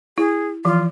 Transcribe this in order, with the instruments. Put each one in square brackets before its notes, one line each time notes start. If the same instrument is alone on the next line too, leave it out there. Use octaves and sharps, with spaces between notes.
[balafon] E4 [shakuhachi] G#4
[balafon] E3 F3 [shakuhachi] F4